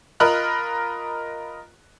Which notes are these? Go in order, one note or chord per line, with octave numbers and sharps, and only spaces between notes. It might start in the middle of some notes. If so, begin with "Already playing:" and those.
F4 A#4 D#5 B5 F6 F#6